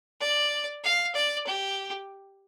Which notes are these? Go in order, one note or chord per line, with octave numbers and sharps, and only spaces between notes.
D5
F5
D5
G4